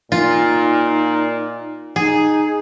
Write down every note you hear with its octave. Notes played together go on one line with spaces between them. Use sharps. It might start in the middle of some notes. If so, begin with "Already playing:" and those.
A#2 D#4 F4
D#4 G#4